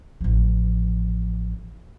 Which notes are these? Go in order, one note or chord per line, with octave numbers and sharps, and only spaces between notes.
A1 F3